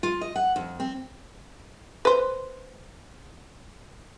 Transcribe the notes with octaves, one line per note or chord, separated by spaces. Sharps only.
F4
D#5
F#5
F2
C4
B4 C5